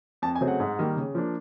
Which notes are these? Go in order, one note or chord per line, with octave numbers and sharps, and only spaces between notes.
F2 A5
G#5
C#3 F#3 A3 C4
F#5
G#2
D#3 G3 A#3
C#3
F3 A#3 D4